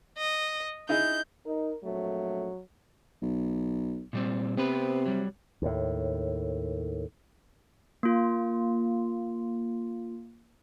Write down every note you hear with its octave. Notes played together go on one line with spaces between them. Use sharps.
D#5
D#4 E4 G#4 G6
D#4 A#4
A#1 F2 F#3 A3
B1
A#2 G3 C4
C3 B3 C4 B4
F#3 G3
D#2 A2
A#3 F4